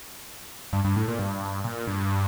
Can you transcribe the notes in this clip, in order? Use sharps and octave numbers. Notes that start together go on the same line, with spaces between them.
G2
G2
A2
A#2
G2
A#2
G2